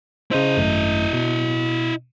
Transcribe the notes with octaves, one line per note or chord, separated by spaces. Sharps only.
C#3 E4 C5 D#5
G#1 F#2 A3
B2